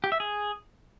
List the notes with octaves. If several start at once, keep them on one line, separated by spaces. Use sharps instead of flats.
G4
E5
G#4